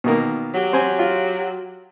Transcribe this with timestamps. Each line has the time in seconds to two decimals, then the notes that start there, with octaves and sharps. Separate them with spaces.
0.04 B2 D#3 A#3
0.55 F#3 G4
0.73 C4 C5 G#5
0.99 F4